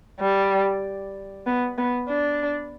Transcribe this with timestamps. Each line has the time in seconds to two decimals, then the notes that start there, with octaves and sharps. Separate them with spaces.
0.20 G3
1.46 B3
1.78 B3
2.09 D4